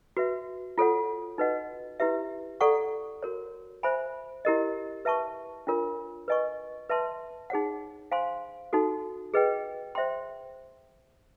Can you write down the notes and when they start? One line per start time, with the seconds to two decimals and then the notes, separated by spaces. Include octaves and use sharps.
0.17 F#4 B4 E5
0.78 F4 A4 C#5 F#5
1.38 D#4 F#4 B4 D#5 F#5
2.00 E4 G4 B4 E5
2.61 A4 D5 F#5 A#5 C#6
3.23 F#4 A#4 C#5
3.83 C5 E5 G#5 B5
4.45 E4 G4 A#4 D#5
5.05 B4 E5 A5 C#6
5.67 D4 F4 A#4 C#5
6.28 B4 D#5 G#5 C#6
6.89 B4 E5 A5 C6
7.50 D#4 G#4 C#5 F#5
8.12 C5 F5 G#5 C6
8.73 D#4 F#4 A4
9.34 G#4 B4 D#5 G5
9.95 C5 E5 G5 C6